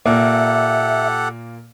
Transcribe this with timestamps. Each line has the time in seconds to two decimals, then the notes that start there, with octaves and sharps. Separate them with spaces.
0.06 A#2 A#3 G4 A4 E5 F#5